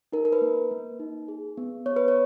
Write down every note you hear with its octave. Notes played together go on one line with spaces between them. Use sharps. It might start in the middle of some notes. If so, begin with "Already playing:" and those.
D#4 A#4
A#4
B4
A#3
A#3
D#4
G#4
B3
B3 C#5
B4
C#5